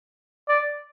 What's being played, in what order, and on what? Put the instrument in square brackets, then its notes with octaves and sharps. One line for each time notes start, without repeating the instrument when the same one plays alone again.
[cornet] D5